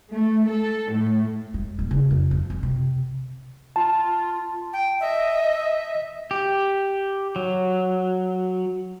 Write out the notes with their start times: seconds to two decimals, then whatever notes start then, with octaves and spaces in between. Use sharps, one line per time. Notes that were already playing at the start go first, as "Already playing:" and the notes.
0.12 A3
0.48 A4
0.92 A2
1.54 G#3
1.79 D#1
1.91 C#3
2.11 F2
2.31 F3
2.50 F2
2.63 C3
3.76 F4 A5
4.73 G5
5.00 D#5 E5
6.31 G4
7.36 F#3